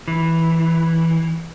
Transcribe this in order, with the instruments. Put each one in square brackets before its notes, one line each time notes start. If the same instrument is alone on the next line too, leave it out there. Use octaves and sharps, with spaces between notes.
[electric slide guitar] E3